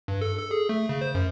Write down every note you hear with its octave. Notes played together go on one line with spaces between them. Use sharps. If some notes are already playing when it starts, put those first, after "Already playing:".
G2
A4
A4
G#4
A3
C#3
C5
F#2